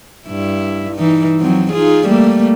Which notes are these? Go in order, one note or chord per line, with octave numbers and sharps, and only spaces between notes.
G2 E4
E3 D#4
F3 F#3 C4
D#4 F4 G#4
G3 A3 A#3